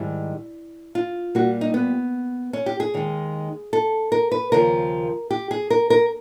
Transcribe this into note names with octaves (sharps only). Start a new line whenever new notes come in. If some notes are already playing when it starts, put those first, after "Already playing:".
Already playing: G#2 D#3 G3 E4
F4
A#2 G3 A#3 F#4
D#4
B3
C#4
G4
G#4
D#2 D#3 G#3
A4
A#4
B4
D#2 C#3 F3 A#4
G4
G#4
A#4
A#4